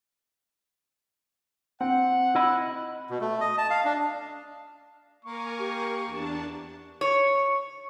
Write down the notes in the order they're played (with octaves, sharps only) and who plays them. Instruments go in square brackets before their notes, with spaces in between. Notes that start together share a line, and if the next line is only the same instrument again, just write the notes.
[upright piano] C4 [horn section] F#5
[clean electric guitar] E4 D#5 B5
[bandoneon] B2
A3
D#5
A5
F5
D4
[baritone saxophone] A#3 [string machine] A#4 G#5 [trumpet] C#6
[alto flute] G4
[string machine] E2 D4 A5
[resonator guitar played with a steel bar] C#5